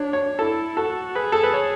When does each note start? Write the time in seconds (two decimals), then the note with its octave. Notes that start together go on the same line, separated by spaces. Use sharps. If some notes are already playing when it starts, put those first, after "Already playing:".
Already playing: D4 C#5
0.13 C#5
0.39 E4 A4
0.77 F#4 A4
1.15 G#4 B4
1.32 A4
1.43 B4
1.53 C#5